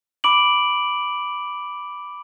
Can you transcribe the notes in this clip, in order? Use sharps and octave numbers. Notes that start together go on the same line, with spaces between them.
B5 D6 D7 F#7